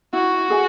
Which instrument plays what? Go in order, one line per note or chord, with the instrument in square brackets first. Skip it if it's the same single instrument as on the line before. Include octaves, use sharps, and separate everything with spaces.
[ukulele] E4 [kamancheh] F#4
[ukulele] G#4 E5 G#5